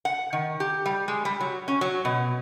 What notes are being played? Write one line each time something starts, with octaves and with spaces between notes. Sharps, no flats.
F#5
D#3
G4
G3
G#3
G3
F#3
C#4
F#3
B2